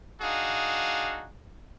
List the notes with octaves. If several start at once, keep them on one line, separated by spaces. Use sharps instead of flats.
D4 D#4 F#4 G#4 F5